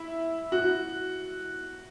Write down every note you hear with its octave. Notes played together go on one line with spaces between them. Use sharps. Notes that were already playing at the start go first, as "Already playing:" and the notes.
Already playing: E4
F#4